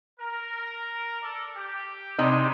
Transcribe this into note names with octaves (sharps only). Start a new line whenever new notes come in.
A#4
A4 D5
G4
C3 G3 G#3 D#4